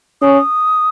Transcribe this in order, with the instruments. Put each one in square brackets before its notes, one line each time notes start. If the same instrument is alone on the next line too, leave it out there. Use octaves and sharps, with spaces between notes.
[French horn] C#4 [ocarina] D#6